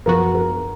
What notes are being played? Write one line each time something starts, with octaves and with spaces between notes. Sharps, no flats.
F#2 F3 B3 F#4 A#4
A#4